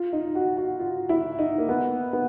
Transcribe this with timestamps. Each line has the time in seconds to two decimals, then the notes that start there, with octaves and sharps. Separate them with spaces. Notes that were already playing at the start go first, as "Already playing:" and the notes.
Already playing: F4
0.13 D#4
0.35 F#4
0.57 F#4
0.80 F4
1.09 E4
1.39 D#4
1.58 A#3
1.69 B3
2.13 B3